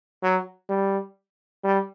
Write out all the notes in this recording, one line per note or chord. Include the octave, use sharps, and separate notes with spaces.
F#3
G3
G3